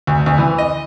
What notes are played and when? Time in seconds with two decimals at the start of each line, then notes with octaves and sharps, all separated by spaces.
0.07 D2
0.26 D2
0.38 E3
0.58 D#5